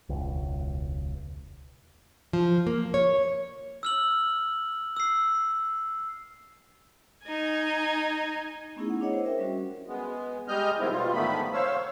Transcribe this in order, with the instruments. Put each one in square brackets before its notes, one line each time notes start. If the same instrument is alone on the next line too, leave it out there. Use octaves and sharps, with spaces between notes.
[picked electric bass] E1 C#2
[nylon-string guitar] F3
A#3
C#5
[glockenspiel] E6 F6 F#7
E6 C7
[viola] D#4 G#5
[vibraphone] A3 B3 C#4 D#4 E4 G#4
F#5
D4 E4 C#5 D#5 F#5
C5
A#4 E5 G5
G3 C#4 F#4
[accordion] G#3 B3
G3 G#3 D#5 F6 G6
A#2 D#3 G3 B3 C4 E4
B2 G3 F4
G#2 D3 D#3 A3 B3 B5
C5 C#5 F5 E6